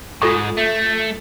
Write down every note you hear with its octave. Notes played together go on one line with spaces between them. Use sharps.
G#2 F4 A4 C#6
A3